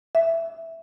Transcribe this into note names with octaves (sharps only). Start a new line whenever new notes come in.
E5